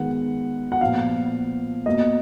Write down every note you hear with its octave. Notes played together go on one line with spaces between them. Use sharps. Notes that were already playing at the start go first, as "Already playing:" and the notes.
Already playing: D#3 G#3 B3 F#5
F#5
A#2 F3 B3 F5
B2 A#3 D#5